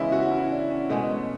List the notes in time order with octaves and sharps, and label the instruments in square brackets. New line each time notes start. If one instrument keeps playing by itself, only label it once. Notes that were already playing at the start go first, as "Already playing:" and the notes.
Already playing: [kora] C#3 E3 G#3 B3 [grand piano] C#4 E4
[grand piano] F#4
E4
D4
C#4
[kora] B2 G#3 C#4 [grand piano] A3